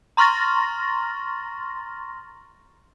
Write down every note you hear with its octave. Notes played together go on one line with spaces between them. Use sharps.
A#5 C6 C#6 F6 A6 A#6